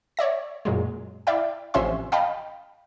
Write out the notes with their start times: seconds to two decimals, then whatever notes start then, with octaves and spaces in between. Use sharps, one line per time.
0.17 C#5 D5 E5 A#6
0.65 F#2 A#2 F#3 G#3
1.27 E4 D5 E5 F5 G5
1.74 A1 C3 F3 C#4 E5 C6
2.12 D#5 F5 G5 A5 B5